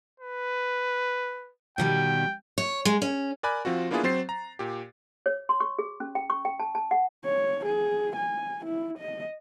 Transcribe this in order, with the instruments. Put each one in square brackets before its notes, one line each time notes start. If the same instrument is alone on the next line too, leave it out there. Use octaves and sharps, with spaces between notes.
[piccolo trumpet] B4
[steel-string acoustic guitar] B2 D#3 G3 [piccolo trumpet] G5
[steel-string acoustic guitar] C#5
G#3
C#4
[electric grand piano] A#4 D5 G#5 B5 F#6
F3 C4 F4 F#4
A#3 B3 D4 E4 F4 G#4
F#3 C4 C5 A6 C7
A#5
A#2 G4
[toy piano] C#5
C6
C#6
G#4
C#4
G5
C#6
G5
A5
A5
F#5
[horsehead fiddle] C#5
G#4
G#5
E4
D#5